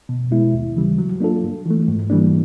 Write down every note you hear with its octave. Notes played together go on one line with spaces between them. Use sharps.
B2
G#3 B3 E4
D#2
C#3 E3 G3
F#3
A#3 D4 F4 A4
G2
E3 A3
G#2
E3 G3 A#3 D4